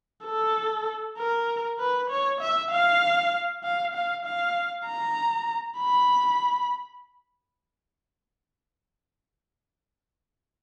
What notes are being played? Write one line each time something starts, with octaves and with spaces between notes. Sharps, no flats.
A4
A#4
B4
C#5
E5
F5
F5
F5
F5
A#5
B5